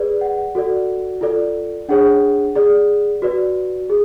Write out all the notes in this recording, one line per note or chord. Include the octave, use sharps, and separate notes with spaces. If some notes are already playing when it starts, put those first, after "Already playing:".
Already playing: G#4 B4 D5
F#5
F#4 A4 D5
F4 A4 D5
D4 G#4 C#5 F#5
G#4 D5
F#4 B4 D5
G#4